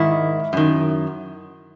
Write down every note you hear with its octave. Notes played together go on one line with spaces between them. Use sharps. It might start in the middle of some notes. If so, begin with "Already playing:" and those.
Already playing: G#2 D#3 E4
F#2 D#3